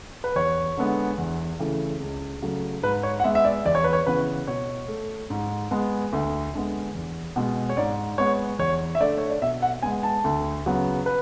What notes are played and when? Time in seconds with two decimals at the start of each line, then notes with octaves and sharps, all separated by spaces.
0.24 B4
0.36 E2 C#5
0.77 D3 G#3 B3
1.18 E2
1.59 C#3 E3 A3
2.00 C#2
2.42 C#3 F#3 A3
2.83 G#2 B4
3.03 C#5
3.20 F#5
3.24 G#3 B3 E5
3.35 E5
3.45 D5
3.66 E2 D5
3.75 C#5
3.84 B4
3.93 C#5
4.07 C#3 E3 B3 B4
4.47 B2 C#5
4.88 A3
5.30 G#2
5.71 G#3 B3
6.13 D2
6.54 D3 G#3 B3
6.95 E2
7.36 B2 G#3 B3
7.69 C#5
7.77 G#2 D5
8.18 G#3 B3 C#5
8.59 E2 C#5
8.95 E5
9.00 D3 A3 D5
9.18 C#5
9.30 D5
9.42 B2 E5
9.62 F#5
9.82 G#3 B3 G#5
10.03 A5
10.24 D2
10.66 C#3 F#3 B3
11.06 B4